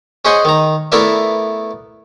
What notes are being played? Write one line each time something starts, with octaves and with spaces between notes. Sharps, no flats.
C#4 G#4 C5 D#5 F#5 G#5
D#3 A#5
A3 B3 E4 A#4 D5 E5